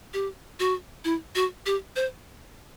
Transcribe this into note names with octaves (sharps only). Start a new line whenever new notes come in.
G4
F#4
E4
F#4
G4
C5